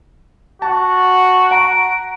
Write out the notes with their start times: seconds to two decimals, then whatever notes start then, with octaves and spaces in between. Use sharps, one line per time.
0.62 F#4 A5
1.51 F#5 A#5 D7